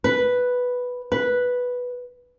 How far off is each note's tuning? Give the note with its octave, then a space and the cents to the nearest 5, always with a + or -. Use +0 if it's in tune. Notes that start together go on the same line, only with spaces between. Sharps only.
B4 +0
B4 -5